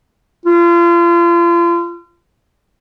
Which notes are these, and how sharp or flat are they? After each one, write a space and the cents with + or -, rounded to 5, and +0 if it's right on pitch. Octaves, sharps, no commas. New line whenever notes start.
F4 -35